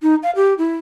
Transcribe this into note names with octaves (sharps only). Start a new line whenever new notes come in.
D#4
F5
G4
E4